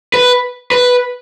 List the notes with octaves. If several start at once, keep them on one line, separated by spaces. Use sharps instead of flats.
B4
B4